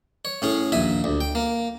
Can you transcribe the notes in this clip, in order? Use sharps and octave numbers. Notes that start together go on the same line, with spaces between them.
C#5
A2 C#4 G#4
A#1 D#2 E5 G#5
D2
G5
A#3